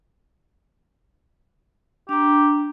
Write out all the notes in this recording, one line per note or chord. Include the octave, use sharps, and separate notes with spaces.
D4 G4 A#5